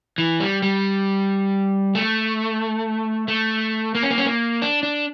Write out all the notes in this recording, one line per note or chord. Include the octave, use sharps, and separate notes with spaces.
E3
G3
G3
A3
A3
A#3
C#4
A#3
C#4
A#3
D4
D4